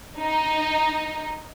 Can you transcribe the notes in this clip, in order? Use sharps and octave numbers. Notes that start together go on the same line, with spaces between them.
D#4